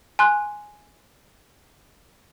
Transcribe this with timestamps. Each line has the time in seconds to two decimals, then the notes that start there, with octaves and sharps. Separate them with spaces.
0.19 G#5 C6 F#6